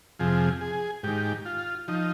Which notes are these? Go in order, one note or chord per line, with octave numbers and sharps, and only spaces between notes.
F2 C3 F3 G#4
G#4
G#2 D#3 G4
F4
F3 D#4